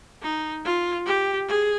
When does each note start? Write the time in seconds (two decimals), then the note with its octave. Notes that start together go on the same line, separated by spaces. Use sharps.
0.22 D#4
0.65 F4
1.06 G4
1.48 G#4